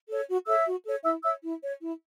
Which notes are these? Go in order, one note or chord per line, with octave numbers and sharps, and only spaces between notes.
A4 C#5
F#4
A4 C#5 E5 E6
F#4
A4 C#5
E4 E5 E6
C#5 E5 E6
E4
C#5
E4